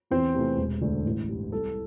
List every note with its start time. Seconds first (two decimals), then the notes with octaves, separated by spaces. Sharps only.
0.11 E2 C4 C5
0.35 C3 E3 A3
0.57 E1
0.81 D2 D3 A3 D4
1.05 A1
1.29 G2 G3
1.52 C2 A4